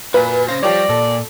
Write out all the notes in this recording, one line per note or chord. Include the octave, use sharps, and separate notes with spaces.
A#2 F#4 B4 G#5
C#4 C5 F5 A#6
F3 G3 G4 C#5 D5
A#2 A4